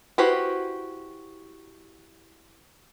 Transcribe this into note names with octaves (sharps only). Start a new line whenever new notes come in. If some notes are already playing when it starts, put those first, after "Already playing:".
E4 F#4 G4 B4 C5